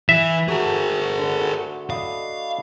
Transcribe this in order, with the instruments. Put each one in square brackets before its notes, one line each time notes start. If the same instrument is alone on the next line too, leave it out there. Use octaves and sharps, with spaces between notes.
[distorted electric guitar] E3 [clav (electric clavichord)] E5
[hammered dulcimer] A3 F#4 [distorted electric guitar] G#4 A#4
[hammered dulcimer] D3
[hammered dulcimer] E4 D5 D#5 [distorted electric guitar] F5